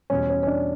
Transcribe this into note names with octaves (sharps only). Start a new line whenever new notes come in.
E2 B2 G3 C#4
C#4
C#4
D4